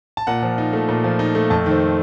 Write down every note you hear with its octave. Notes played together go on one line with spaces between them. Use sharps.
A5
A#2 F#5
F3
D#4
A3
A#2
F3
D#4
A3
F2 A5
D#3 C5